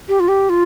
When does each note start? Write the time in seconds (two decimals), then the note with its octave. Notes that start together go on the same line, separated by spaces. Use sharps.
0.08 G4
0.20 F4
0.28 G4
0.49 F4